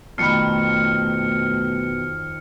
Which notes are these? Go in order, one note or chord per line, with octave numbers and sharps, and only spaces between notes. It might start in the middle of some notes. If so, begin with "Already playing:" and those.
F2 B2 D#3 A3 B5 F6 C#7